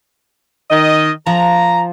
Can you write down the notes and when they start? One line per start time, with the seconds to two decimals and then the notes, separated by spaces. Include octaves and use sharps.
0.71 D#3 D#5
1.27 F3 A#5